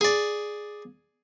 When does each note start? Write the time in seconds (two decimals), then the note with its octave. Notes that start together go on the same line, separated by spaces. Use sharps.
0.01 G#4 D5